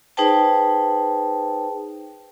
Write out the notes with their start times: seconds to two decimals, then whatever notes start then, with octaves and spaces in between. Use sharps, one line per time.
0.17 D#4 G#4 B4 C5 G5 A5